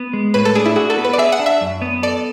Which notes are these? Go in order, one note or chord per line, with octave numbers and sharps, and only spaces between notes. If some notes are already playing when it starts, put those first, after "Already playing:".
Already playing: B3
G#3
A2 B4
A4
D4 G#4
E4
F#4 G#4
A4
B3
B4
D5
G#4 E5
F#5
D4
E5
F#2
B3
A4 D5